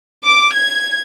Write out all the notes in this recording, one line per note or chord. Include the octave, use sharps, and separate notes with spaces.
D6
G#6